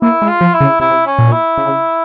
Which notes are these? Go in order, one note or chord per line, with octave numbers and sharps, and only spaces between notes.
A#3 E4
G#3
F4
F3
E4
C#3
C3 E4
C#4
A#2
E4
C#3